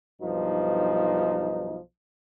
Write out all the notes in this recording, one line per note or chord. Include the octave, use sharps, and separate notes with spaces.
B1 G2 F3 D#4